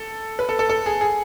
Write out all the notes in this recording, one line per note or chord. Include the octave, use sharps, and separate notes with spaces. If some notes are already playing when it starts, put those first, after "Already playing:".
Already playing: A4
B4
A4
A4
A4
G#4
G#4